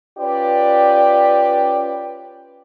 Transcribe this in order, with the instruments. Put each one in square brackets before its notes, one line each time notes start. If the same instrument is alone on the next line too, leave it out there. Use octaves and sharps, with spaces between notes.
[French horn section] C#4 F4 G4 B4 D5